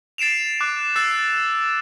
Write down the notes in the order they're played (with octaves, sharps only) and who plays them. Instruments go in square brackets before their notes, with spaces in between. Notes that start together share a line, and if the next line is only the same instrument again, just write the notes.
[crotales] A6 C7 D7 E7 F7
D6 F#6
E6 F#6 A6 C7